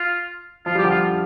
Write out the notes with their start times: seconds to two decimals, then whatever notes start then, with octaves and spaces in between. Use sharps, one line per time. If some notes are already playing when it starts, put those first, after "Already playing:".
Already playing: F4
0.66 F3 F4
0.75 G3 G4
0.84 D3 F3
0.90 F4